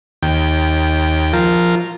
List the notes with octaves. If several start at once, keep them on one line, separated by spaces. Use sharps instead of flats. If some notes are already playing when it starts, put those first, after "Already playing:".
D#2 G5
F3 F4 A#4